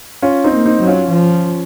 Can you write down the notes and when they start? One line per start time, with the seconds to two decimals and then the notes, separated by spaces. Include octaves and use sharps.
0.22 C#4 F4
0.44 C4 D#4
0.52 A#3
0.66 C4 D#4
0.81 F#3
0.87 C#4 F4
1.09 F3